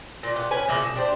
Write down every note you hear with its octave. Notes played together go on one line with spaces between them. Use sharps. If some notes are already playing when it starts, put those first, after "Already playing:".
A#2
B3 F4 G4
C#4 B4 G#5
A#2 C#3 E3 F3
B2
D4 G4 C5